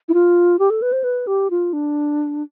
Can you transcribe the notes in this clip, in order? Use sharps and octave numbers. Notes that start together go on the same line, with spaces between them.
E4
F4
G4
A4
B4
C5
B4
G4
F4
D4